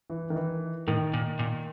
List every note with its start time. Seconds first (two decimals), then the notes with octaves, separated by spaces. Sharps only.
0.10 E3
0.30 D#3
0.36 E3
0.87 A2 D#3
1.14 A#2
1.39 A#2